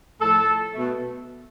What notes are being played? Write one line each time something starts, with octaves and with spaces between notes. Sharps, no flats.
A2 F3 A3 A4
B2 A3